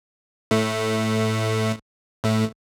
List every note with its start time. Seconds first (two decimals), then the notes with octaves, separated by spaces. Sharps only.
0.51 A2 A3
2.24 A2 A3